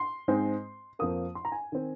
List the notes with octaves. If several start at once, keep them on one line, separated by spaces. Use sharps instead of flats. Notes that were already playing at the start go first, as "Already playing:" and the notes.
Already playing: C6
G#2 G#3 C4
F2 F3 A#3 D#6
C6
A#5
G#5
D#3 C4